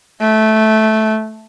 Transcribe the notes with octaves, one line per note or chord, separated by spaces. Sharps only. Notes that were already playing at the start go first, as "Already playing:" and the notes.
A3